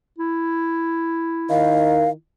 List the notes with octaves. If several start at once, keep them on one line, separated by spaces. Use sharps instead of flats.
E4
D#3 F5